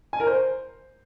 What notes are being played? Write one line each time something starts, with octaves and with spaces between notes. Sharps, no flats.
G#5
A#4
C5